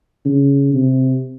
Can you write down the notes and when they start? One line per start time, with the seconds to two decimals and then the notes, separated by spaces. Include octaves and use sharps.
0.25 C#3
0.74 C3